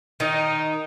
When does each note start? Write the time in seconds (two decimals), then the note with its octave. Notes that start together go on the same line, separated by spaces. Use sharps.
0.20 D#3 D#4